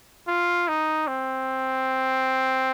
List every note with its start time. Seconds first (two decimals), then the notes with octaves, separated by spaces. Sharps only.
0.28 F4
0.68 D#4
1.08 C4